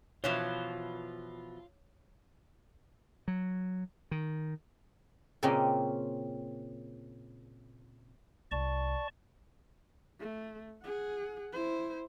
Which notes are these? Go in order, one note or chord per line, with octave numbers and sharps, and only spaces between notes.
B2 E3 F3 F4 C#5
F#3
D#3
A#2 C#3 C4 C#4 G4 D#5
C2 D5 A5 C#6
A3
G#4 F#5
E4 C5